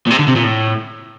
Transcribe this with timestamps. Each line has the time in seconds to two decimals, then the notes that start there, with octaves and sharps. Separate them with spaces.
0.07 A#2
0.10 C3
0.19 D3
0.28 C3
0.36 A#2
0.44 A2